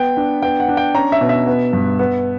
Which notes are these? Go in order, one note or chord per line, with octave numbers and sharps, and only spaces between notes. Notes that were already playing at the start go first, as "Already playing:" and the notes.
Already playing: B3 G5
D4
B3 G5
F#5
D4
G5
C#4 A#5
E5
B2
E5
B3
G2
B3